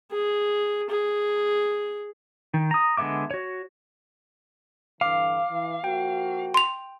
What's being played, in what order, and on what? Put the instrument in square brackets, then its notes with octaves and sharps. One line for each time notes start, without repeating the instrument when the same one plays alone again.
[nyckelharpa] G#4
G#4
[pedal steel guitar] D#3
A#5 D#6
D3 G#3 B3 E5 D6
F#4 C#5
[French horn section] G2 D3 E3 [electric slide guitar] F5 [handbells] D6
[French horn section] E3
[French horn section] F3 A#3 F#4 [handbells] G5
[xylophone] C6 F7